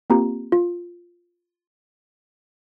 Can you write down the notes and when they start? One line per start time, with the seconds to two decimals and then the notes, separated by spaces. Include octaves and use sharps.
0.10 A#3 C4 F4 G4 A#5
0.52 F4